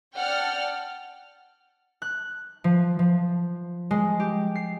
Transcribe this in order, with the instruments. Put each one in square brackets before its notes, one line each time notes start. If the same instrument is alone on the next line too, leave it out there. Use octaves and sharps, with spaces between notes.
[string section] D5 F#5 G5 A5 F6
[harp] F#6
F3
F3
G#3
G4
C7